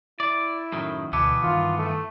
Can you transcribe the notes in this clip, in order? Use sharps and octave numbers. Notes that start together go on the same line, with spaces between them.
E4 D5
F#2 A2 D#3
D2 B2 D3 E3 B3 A5 D6
G2 D#3 F4
A3